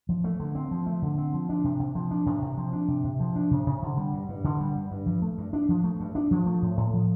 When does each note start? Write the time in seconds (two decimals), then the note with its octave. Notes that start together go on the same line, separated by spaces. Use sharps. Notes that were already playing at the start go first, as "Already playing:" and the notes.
0.09 F3
0.24 A3
0.40 D3
0.55 C4
0.71 F3
0.86 A3
1.02 D3
1.18 C4
1.33 F3
1.49 D4
1.64 C3
1.80 C3
1.95 F3
2.11 D4
2.26 C3
2.42 C3
2.57 F3
2.73 D4
2.88 C3
3.04 C3
3.20 F3
3.36 D4
3.51 C3
3.66 C3
3.82 D3
3.97 G3
4.13 G2
4.29 G2
4.44 D3
4.60 G3
4.75 G2
4.91 G2
5.06 F3
5.22 A3
5.38 G2
5.53 D4
5.69 F3
5.84 A3
6.00 G2
6.15 D4
6.31 F3
6.46 A3
6.62 A2
6.77 A2
6.93 F3